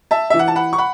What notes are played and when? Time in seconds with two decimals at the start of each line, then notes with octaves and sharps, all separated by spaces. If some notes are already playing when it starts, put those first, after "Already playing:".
0.11 E5 A5
0.30 E5
0.34 E3
0.39 F#5
0.48 A5
0.55 F#5 B5
0.73 C#6
0.78 F#5 B5